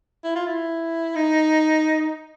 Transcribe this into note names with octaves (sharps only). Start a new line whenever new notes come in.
E4
F4
E4
D#4